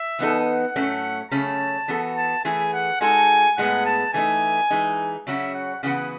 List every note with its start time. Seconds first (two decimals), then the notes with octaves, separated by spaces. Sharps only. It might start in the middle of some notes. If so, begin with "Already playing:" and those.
Already playing: E5
0.19 E3 B3 D#4 A4
0.47 F#5
0.76 A2 F#3 A3 C#4
1.31 C#3 F#3 A3 C#4 A5
1.88 E3 B3 F#4 A4
2.17 A5
2.45 E3 A3 E4 G#4 G#5
2.73 F#5
3.01 G#3 D#4 F#4 A4 G#5
3.58 A2 G#3 B3 F#5
3.86 A5
4.13 E3 A3 D#4 G#5
4.70 E3 G#3 D#4
5.27 C#3 F#3 C#4 F#4 E5
5.54 F#5
5.83 C#3 E3 B3 F#4 F#5